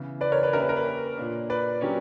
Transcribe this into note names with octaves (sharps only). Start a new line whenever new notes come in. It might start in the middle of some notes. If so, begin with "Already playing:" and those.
Already playing: C#3 E3 B3
B4 D5
A#4 C#5
B4
A#3 C#4 G4 A#4 C#5 E5
B4
A#4
B4
A#2 A#3 D4
B4 D5
F#3 A#3 C#4 G4 C#5